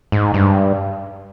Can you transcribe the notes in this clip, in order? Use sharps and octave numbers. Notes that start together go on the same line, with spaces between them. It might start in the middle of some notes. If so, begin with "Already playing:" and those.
G#2
G2